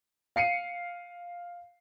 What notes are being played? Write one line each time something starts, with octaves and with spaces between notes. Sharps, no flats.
F5 C7 C#7 D#7